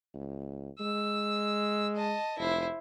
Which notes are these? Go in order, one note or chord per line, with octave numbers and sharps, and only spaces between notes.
C#2
G#3 E6
D#5 A5
F1 E4 C5